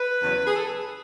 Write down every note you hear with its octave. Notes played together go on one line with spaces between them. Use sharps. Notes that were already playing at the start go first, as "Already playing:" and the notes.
Already playing: B4
E2 C#3 F#3
G#4
A4